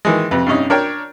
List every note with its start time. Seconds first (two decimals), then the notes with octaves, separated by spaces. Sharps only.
0.05 D#3 E3 G#3
0.31 F2 C3 B4
0.46 G2 C3 C#4 D#4
0.70 D4 A#4 C#5 G5